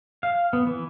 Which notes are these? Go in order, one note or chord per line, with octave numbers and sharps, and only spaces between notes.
F5
B3
E3